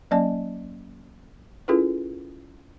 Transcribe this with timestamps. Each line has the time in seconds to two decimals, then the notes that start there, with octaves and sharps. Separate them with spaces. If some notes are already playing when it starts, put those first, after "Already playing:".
0.11 F#3 A#3 C#4 D5 D#5 A5
1.68 C#4 E4 F4 G#4 A4 B4